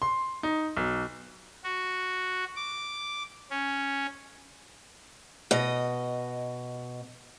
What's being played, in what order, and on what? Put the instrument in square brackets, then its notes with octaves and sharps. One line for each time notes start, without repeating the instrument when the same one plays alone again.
[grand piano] C6
D#4
B1
[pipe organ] F#4
D6
C#4
[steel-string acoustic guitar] B2 D#5